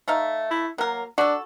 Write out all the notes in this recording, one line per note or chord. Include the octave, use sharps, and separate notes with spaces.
A3 D#4 F5
E4
F#3 A#3 A#4
D4 F#4 A4